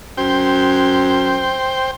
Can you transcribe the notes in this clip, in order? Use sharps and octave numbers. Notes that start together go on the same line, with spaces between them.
F#2 C5 G5